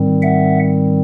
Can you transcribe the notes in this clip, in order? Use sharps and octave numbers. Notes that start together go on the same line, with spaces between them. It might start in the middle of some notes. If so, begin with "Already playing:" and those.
Already playing: G#2 D#3 G3 C4
E5 F#5